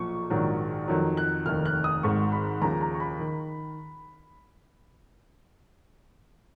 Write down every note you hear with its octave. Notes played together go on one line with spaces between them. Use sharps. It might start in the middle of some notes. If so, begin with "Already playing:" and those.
Already playing: B1 A#2 F3 C#6
A#1 G#2 D#3 F#3
F2 D#3 F#3
F#6
F1 D#2 D#3 F6
F#6
D#6
G#1 G#2 D#3 C#6
B5
D#2 C#3 F3 A#5
A#5
C#6
B5
D#3